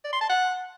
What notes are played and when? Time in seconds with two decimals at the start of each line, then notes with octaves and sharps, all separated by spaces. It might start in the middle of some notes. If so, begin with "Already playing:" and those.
0.04 D5
0.13 C6
0.21 A5
0.30 F#5